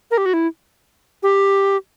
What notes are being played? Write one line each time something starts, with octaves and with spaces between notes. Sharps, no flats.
A#4
G4
F#4
E4
G4